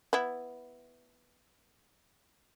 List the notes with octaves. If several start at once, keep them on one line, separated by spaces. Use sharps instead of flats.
B3 E4